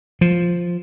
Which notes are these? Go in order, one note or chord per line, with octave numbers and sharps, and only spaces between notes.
F3